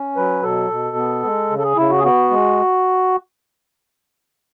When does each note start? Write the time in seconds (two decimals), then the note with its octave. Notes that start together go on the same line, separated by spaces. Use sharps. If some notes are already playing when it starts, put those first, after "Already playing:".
Already playing: C#4
0.16 F#3 B4
0.43 B2 A4
0.70 B2
0.97 B3
1.24 G#3
1.50 C#3
1.58 A4
1.63 G#4
1.77 C#3 E4
1.90 F#4
1.98 G#4
2.04 B3 F#4
2.30 G#3